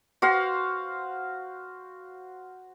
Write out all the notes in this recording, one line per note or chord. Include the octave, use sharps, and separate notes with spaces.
F#4 C5 F5